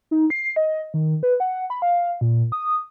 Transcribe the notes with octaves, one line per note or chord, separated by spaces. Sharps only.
D#4
C7
D#5
D#3
B4
F#5
B5
F5
A#2
D#6